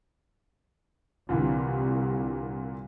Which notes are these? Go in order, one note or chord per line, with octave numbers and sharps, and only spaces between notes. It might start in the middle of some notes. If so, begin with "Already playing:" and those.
C2 A#2 D3 E3